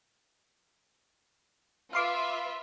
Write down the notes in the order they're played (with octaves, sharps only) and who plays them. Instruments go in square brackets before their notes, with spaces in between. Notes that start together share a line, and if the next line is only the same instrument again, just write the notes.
[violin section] F4 B4 E5 [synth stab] F5 C6 D6